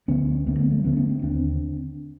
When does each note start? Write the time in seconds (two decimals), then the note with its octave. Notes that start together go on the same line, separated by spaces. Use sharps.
0.08 D2 D3 B3 C#4
0.46 D2 D3 A#3 C4
0.59 A3 B3
0.71 G3 A3
0.84 D2 D3 B3 C#4
0.97 B3 C#4
1.09 A#3 C4
1.22 D#2 D3 C4 D4